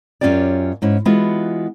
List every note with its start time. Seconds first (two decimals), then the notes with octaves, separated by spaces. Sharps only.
0.21 F#2 D3 C#4 F4 G4 D5
0.82 G#2 C#4 E4
1.05 E3 G#3 B3 F4 F#4